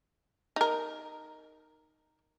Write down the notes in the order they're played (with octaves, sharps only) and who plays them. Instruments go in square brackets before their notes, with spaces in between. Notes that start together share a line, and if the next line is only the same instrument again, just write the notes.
[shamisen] D#4 A#4